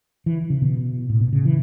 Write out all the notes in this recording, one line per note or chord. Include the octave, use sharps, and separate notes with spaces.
E3
C#3
B2
A2
B2
C#3
E3